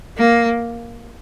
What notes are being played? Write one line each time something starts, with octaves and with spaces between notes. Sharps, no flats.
A#3